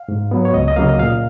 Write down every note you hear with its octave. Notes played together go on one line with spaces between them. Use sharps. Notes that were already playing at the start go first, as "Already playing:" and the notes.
Already playing: F5
G#2
F#3 B3
C#5
C#2 D#5
D#5
C#3 F#3 A#3 F5
D#5
A#2 F5